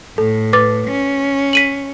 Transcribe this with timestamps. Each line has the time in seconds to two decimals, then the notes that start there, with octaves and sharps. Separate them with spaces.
0.18 A2 A4
0.53 B4 D6 A6
0.88 C#4
1.53 B6 D#7 F#7